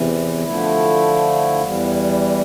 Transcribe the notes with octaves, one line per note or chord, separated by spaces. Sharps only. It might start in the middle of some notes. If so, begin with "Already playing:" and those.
Already playing: E2 C3 E3
D3 F3 A3 E4
E2 E3 G3